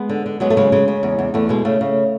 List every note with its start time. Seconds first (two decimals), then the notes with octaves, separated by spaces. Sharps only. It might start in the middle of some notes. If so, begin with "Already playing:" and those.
Already playing: G#3 B3
0.09 D3
0.26 D3
0.40 F#3 G#3 B3
0.50 A3
0.57 C#3 G#3
0.72 C#3 G#3
0.88 C#3
1.03 E2
1.19 E2
1.34 E2 A3
1.49 B2 G#3
1.65 C#3 A3
1.81 C#3